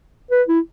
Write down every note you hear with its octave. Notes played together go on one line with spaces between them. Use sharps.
B4
E4